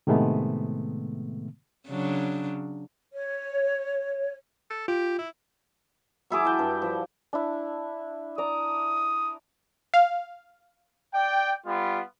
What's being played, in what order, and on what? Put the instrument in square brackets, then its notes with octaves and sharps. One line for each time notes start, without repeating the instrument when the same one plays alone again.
[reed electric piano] A2 C3 D#3 G#3 A3 B3
[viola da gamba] C#3 F#3 D4
[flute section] C#5
[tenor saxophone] A4
[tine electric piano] F4 [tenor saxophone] G4
[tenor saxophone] E4
[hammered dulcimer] F#3 E4 G#4 D6
G5 A5
G2
F3
[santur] D4 E4
[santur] D5 A#5 [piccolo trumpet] D#6
[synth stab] F5
[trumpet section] D5 G5
G3 B3 F4